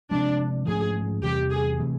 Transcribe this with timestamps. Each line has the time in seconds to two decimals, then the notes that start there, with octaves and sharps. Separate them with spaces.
0.11 C3 F3 G#3 D4
0.67 G#2 F3 A3 C#4 G#4
1.24 E2 C3 E3 G3 G4
1.51 G#4
1.79 C3 E3 A3